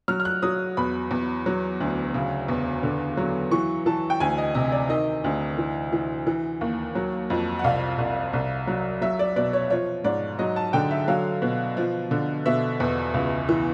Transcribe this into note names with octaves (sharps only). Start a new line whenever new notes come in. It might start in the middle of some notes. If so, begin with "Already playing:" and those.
F#3 F6
F6
F#6
F#3 D#6
E2 B5
E2
F#3
D2
C#3
E2
D3
F#3
E3 C#6
E3 A5
G5
D2 G#5
D#5
C3 D#5
D5
D#3 D#5
D2
E3
E3
E3
D#2
F#3
F2
F#5
C2 F5
C2
C2
F#3
F#3 E5
D5
B2 D5
C#5
F3 C#5
G#2 D5
F#3 D#5
A5
D3 G5
E5
F#3 F5
B2
F3
D3
B2 E5
E2
C#2
E3